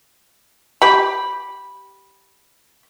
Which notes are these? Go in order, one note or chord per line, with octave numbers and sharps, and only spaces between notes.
G4 B5